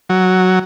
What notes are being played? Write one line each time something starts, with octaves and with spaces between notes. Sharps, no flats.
F#3